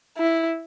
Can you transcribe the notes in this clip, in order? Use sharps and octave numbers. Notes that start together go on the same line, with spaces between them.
E4